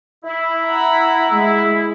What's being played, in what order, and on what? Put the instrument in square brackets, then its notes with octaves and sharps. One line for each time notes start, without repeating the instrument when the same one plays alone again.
[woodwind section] E4
[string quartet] F#5 A#5 B5
G#3